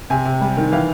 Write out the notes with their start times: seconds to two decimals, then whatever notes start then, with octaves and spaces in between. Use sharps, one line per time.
0.10 C3 G#5
0.25 C3
0.41 G3
0.57 D#3
0.72 E3 F5